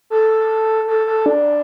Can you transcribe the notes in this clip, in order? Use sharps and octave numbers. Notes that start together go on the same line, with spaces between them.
A4
A4
A4
D4